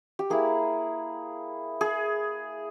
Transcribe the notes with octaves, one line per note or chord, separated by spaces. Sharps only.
G4
A#3 E4 G#4
G#4